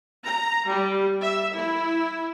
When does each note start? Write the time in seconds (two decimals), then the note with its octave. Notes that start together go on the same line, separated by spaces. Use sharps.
0.25 A#5
0.68 G3
1.21 E5
1.56 E4